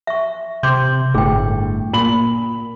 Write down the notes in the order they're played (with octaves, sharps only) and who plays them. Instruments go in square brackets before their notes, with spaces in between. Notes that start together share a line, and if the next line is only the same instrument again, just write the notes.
[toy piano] E5 C#6
[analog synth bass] C3 [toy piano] C6 D6 [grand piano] G6
[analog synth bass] G1 [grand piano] A2 [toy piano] G#4 G5
[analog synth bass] A#2 [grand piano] B5 F#7